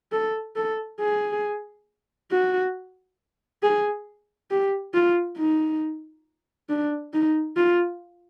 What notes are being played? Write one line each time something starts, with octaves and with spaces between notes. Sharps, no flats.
A4
A4
G#4
F#4
G#4
G4
F4
D#4
D4
D#4
F4